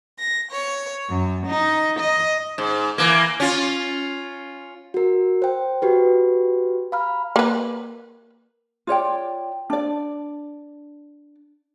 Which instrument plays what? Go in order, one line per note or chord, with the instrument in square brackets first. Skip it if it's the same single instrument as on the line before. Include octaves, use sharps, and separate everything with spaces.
[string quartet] A#6
C#5
F#2
D#4
D#5
[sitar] G#2
E3 A#3
C#4 F4
[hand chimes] F#4 A#4
C5 G5
F#4 G4 B4
F5 A#5 B5 F6
[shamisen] A#3 B4
[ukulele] F4 C#5 D5 G5
D4 D5